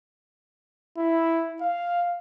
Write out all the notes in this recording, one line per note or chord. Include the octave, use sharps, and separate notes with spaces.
E4
F5